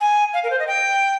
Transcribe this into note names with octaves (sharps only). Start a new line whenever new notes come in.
G#5
F5
A#4
C5
D#5
G5